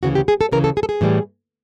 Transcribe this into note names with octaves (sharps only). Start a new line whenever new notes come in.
D2 C#3 E3 F#4
G4
G#4
A4
D2 C#3 E3 A#4
A4
G#4
A4
G#4
A2 E3 G3